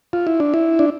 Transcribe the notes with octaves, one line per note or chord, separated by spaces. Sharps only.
F4
E4
D4
E4
D4